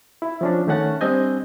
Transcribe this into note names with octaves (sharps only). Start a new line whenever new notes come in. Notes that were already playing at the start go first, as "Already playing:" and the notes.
E4
F3 C#4 D4
D#3 A3 C#4 F#5 A5
G3 C4 D4 D#5 G#5 G6